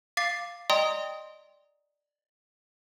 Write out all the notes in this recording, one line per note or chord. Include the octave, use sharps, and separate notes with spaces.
F5 D6 A6 C7
D5 D#5 G5 A#5 C6 D#6